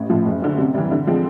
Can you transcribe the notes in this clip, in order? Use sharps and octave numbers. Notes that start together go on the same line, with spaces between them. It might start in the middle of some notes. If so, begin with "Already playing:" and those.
Already playing: A1
A2 F3
F#1
F#2 D3
C3
E3 G3
D3
F3 G#3 C4